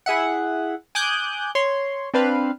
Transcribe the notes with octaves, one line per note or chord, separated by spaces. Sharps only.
E4 G#4 E5 F#5
G#5 D6 D#6 F#6 G6
C#5 C6
C4 D4 B4 C5 F5